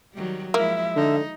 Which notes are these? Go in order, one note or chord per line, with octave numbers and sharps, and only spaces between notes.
D#3 F#3 G3
F3 G#3 A#3 E4 E5
D3 D#4